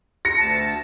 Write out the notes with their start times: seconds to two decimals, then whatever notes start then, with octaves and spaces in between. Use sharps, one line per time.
0.25 A#6 C#7
0.38 D2 A5